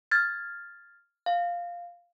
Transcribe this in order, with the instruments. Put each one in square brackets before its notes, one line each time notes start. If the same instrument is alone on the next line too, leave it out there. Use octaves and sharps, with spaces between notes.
[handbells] F6 G#6 A6
F5